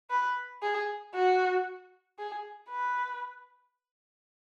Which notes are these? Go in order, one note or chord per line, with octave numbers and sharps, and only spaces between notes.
B4
G#4
F#4
G#4
B4